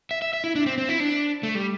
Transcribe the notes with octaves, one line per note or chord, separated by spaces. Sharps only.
E5
E5
E5
E4
D4
C4
C4
E4
D4
A3
G3